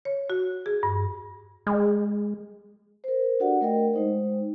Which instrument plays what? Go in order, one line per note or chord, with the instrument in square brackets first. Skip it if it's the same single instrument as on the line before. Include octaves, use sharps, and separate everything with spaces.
[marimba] C#5
F#4
G#4
G2
[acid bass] G#3
[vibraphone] A#4 C5
D4 F#4 G4 A4 D5 F#5
A3 A#4 D#5 G5
G#3 D#4 C5